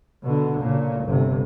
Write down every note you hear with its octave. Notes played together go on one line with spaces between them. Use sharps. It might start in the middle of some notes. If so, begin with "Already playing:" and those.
B2 D3
A#2 C#3
G1 C3